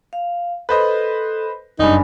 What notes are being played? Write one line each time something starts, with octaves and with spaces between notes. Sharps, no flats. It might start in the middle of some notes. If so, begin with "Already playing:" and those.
F5
A4 B4 C5 D#5
F#1 G2 D#4 D5 G#5 B5